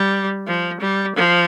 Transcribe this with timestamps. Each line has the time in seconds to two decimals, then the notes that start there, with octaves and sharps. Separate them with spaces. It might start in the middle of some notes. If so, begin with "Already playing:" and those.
Already playing: G3
0.47 F3
0.81 G3
1.16 F3